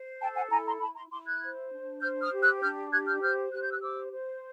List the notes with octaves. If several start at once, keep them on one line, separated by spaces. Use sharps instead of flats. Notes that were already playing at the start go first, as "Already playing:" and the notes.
Already playing: C5
A4 G5 A5
F#5 G#5
E4 G#5 A#5
A#5 C6
E4 A5 B5
A#5 C6
E4 C6 D6
F#6 G#6
C5
D4
C5 F6 G6
D#6 F6
G4
E6 F#6
D4 F6 G6
G4 F#6 G#6
F6 G6
C5 F6 G6
G4 F#6
G6
E6 F#6
C5 D6 E6
C5